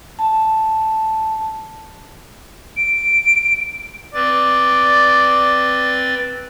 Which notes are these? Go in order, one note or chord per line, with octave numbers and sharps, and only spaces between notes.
A5
D7
C4 B4 D5 A6